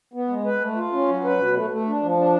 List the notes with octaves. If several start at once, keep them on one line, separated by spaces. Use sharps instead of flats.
B3
G#3
B4
A3
F4
C#4
F#3
B4
B2
A3
A3
D4
F3
D4